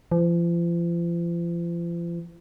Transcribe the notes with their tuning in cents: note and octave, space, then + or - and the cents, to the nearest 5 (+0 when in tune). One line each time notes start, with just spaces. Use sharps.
F3 -40